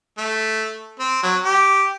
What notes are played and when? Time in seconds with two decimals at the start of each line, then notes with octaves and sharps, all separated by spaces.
0.18 A3
1.00 C4
1.23 F#3
1.45 G4